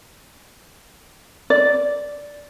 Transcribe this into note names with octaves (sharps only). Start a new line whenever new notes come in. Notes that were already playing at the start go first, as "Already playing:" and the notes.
D5